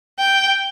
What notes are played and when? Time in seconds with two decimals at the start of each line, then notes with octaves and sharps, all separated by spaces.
0.18 G5